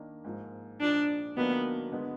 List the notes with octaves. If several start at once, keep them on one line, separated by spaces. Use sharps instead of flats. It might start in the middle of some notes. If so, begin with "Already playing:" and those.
Already playing: D#3 A#3 D4
G#2 F3 A#3
A#2 F3 G#3 D4 D#4
D#3 F#3 A#3 B3 D4
D3 G#3 B3